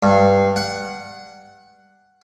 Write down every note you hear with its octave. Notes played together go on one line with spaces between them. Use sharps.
G2
F#5